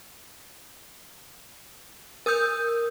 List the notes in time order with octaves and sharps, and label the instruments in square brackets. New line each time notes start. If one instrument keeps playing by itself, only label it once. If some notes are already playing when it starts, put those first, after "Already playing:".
[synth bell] A#4 D#6 E6 G6